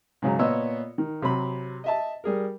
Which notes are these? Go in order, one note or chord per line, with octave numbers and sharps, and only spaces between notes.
G#2 C#3 F#3
A#2 B3 C#5 D#5 E6
D#3
C3 F#3 B5
D#5 E5 A5
G3 G#4 A#4